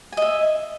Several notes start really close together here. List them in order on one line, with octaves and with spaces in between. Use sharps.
G#5 D#5 E5